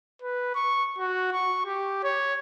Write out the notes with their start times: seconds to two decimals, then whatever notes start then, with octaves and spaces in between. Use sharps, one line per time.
0.22 B4
0.55 C#6
0.98 F#4
1.32 C#6
1.66 G4
2.04 C#5